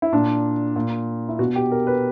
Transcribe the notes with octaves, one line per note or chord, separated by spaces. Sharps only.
E4
A#2 D4
A#2
E4
B2 F#4
G4
A#4
B4